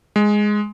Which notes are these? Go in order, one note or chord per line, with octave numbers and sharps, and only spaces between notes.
G#3